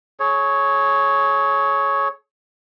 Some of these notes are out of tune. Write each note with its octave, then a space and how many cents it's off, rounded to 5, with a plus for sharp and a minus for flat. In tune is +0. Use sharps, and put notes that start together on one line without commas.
G#4 +35 C#5 +0